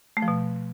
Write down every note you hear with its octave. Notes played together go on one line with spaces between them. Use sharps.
A3
F3
B2